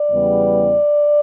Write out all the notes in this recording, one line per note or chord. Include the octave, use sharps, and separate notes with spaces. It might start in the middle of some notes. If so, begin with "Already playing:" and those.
Already playing: D5
E2 C#3 G3 B3